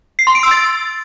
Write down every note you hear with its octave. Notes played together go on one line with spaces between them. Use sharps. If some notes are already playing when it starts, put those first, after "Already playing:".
C7
C6
D7
E6
A6